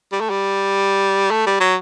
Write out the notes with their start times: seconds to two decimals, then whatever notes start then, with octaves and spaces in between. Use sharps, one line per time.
0.13 G3
0.21 A3
0.30 G3
1.31 A3
1.46 G3
1.60 F#3